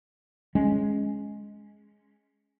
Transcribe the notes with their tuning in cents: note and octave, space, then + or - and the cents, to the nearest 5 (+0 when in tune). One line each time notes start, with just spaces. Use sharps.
G#3 +5 C#4 +0